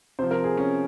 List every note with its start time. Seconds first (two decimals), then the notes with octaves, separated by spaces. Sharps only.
0.19 C3 F3 C5
0.31 A#4
0.44 G#4
0.57 C#4